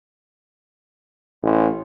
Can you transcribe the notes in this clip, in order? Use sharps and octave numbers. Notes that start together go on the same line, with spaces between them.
A1